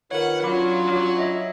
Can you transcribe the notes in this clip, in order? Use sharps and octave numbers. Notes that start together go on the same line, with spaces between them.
D#3 F4 A#4 B4 C#5 F#5
F#3 C#4 D4 F4 B5 D6
C#5 D#5 E5